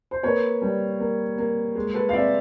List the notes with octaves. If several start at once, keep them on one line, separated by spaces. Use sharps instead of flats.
C5
A#3 B4 C#5
G3
A#3
A#3
G#3
A4 B4
F5
C4 D5 E5